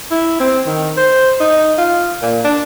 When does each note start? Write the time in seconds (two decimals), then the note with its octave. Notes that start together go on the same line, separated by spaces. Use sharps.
0.11 E4
0.40 C4
0.66 D#3
0.97 C5
1.40 D#4
1.78 F4
2.22 A#2
2.45 D4